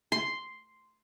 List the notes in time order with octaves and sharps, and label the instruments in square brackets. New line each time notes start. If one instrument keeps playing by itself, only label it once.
[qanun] C6